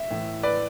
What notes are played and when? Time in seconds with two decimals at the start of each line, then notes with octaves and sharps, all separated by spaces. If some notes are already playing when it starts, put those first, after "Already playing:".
Already playing: E5
0.10 A2 E3
0.43 B4 D5